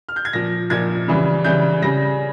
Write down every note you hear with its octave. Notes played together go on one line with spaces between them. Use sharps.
F6
G6
G#6
A#2 F3 A#6
A#2 F3 G#6
C#3 E3 G3
C#3 E3 G3 G6
C#3 G3 A#6